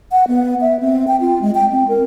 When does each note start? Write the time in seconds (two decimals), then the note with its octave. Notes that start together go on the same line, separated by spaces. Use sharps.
0.12 F#5
0.28 B3
0.61 E5
0.80 C4
1.07 G5
1.21 F4
1.42 G#3
1.55 G5
1.72 C4
1.88 A#4